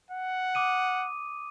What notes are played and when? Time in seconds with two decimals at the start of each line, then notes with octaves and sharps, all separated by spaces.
0.10 F#5
0.55 D6 D#6 D#7